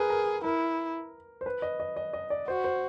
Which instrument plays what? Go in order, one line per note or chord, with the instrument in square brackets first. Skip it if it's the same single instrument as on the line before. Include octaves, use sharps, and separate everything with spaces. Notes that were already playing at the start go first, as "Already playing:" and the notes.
Already playing: [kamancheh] G#4 [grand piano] A#4 B4
[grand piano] A#4
[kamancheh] E4 [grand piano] A#4
[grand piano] C5
B4
D#5
D#5
D#5
D#5
D5
[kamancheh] F#4 [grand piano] C5
[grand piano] C5